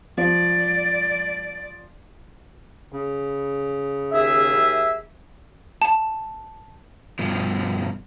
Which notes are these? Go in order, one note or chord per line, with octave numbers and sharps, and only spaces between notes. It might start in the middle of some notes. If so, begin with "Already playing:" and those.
F3 D5
C#3
D#2 G#4 E5
A5
G2 B2 F3